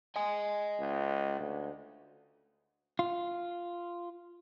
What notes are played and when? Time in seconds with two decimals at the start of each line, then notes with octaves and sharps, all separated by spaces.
0.16 D#5 G#5
0.80 C#2
1.39 D2
2.99 F4